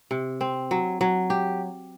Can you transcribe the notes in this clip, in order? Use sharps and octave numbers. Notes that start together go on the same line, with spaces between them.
C3
C4
F#3
F#3
G4